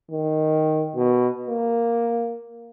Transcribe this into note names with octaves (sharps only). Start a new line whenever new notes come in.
D#3
B2
A#3